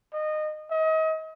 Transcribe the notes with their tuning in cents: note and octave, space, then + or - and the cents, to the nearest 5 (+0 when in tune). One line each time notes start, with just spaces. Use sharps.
D#5 -20
D#5 +35